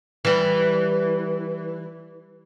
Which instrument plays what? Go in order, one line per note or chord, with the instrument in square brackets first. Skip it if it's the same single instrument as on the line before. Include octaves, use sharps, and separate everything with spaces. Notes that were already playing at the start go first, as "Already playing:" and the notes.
[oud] E3 G3